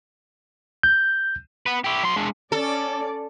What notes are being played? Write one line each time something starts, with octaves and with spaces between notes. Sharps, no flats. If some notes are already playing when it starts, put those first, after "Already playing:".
G6
B3 B4
E4 G4
F#3 C6
G#3 D4
C#4 A4 D5